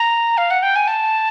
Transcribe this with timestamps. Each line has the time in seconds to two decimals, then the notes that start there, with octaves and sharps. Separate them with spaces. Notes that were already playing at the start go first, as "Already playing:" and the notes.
Already playing: A#5
0.38 F5
0.51 F#5
0.63 G5
0.76 G#5
0.88 A5